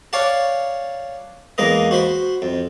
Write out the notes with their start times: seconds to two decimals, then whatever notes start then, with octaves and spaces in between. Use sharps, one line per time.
0.13 C#5 D5 F5 F#5 A5
1.58 E2 G#3 A#3 B4 D#5
1.91 F#4 C5 B5
2.42 F2